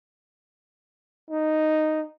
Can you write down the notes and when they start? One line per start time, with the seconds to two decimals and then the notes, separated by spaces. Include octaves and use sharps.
1.30 D#4